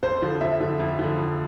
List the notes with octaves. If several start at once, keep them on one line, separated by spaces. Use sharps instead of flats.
F2 C5
D3 F3
F2 E5
D3 F3
F2
D3 F3
F2